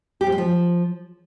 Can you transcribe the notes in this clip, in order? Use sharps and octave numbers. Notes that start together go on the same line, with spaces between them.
G4
C4
G#3
F3